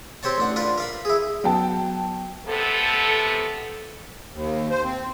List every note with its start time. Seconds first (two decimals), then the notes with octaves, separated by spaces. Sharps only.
0.23 C4 G4 C5 C#5 A5
0.38 A1 D4 F#5
0.56 D4 F4 A#4 B4 D5
0.78 A#4 F5 B5
1.05 E4 G#4
1.44 F#3 B3 G5 A5
2.46 C3 B3 A4
4.34 D#2
4.71 C5
4.84 C4